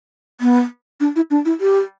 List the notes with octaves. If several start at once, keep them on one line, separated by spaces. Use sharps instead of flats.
B3
D4
E4
D4
E4
G4